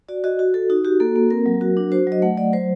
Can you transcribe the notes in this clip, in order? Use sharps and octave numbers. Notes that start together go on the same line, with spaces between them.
F#4 D5
F#4 D#5
F#4
F#4 A4
D#4 F#4
F#4 G4
A#3 A4
A#3
C4 A#4
F#3
F#4
D4
F#4 C5
F#3 D#5
A3 F#5
A3 D5
F#3 C5